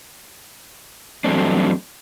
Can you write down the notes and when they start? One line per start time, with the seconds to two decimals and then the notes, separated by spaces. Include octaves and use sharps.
1.24 E2 G2 F#3 A3 C4 D4